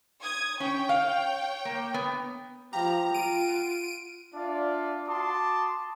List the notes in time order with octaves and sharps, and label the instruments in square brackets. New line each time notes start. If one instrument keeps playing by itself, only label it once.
[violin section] D#6 G#6
[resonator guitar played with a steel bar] C#4 [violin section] C#5 G5
[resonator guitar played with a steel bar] F5
A#3
B3
[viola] F3 [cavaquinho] G4 F5 B5 [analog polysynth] A#5
[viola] F4 [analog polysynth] D7 D#7
[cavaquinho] F#5
[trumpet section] D4 F4 D5 E5 A5
F#4 A5 C6 D6 D#6